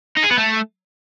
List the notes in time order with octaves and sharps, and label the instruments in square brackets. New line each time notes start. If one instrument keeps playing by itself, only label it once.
[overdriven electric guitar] D#4
G#4
B3
A3